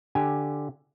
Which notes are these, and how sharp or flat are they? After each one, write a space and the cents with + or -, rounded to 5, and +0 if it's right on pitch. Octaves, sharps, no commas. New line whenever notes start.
D3 +0 G4 +0 G#5 +0